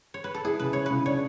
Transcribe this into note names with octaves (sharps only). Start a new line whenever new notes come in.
C#5
B4
A4
E4 G#4
C#3 B4
E4 C#5
C#3 B4
D4 C#5